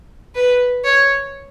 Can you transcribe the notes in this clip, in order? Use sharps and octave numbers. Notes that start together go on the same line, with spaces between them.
B4
C#5